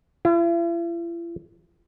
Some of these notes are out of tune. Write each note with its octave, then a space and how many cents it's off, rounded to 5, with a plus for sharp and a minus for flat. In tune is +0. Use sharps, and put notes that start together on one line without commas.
E4 +45